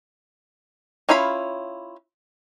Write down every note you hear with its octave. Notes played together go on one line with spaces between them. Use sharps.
C#4 E4 F4 F5 B5